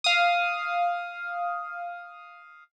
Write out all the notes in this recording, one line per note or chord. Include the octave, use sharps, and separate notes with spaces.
F5 D#6